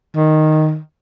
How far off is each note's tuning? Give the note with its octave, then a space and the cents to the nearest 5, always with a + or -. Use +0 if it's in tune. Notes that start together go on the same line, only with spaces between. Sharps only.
D#3 -5